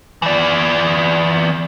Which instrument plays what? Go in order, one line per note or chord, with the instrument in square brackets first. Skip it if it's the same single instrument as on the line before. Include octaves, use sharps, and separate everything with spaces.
[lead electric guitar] E3 D5